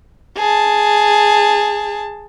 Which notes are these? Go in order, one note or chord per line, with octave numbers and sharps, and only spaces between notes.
G#4 A5